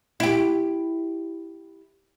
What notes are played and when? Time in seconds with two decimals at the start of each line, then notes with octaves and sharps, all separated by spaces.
0.20 E4 G4